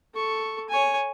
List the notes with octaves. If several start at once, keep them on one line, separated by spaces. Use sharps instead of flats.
A4 C#6
C#5 G#5